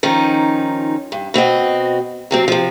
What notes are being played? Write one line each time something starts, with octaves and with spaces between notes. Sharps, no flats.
D#3 F3 C#4 D#4
G2
B2 C4 F#4 D#5
C3 F#3 C4
C3 F3